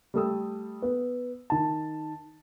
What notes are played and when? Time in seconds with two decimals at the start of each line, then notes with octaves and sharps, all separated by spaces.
0.14 G3 A3 A4 G5 D#6 E6
0.82 B3
1.50 D#3 A5